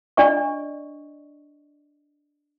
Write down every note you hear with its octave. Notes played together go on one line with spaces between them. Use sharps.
D4 D5 D#5 C#6